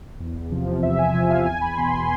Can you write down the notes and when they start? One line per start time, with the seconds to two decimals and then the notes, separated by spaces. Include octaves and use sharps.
0.20 E2
0.51 C3 F3
0.83 E2 E5
0.98 G#5
1.14 C3 F3 G#5
1.30 F5
1.46 E2 G#5
1.61 B5
1.77 B2 C6
1.93 C6